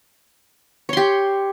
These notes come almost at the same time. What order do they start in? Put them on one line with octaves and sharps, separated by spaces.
C#5 C6 G4